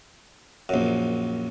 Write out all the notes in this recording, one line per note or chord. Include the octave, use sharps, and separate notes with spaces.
A#1 F#2